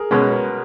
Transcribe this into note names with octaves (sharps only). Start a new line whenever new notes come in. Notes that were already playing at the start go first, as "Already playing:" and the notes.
Already playing: G#4 A#4
B2 G#3 C#4 F#4 B4
A#4